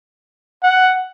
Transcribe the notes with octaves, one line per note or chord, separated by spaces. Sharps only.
F#5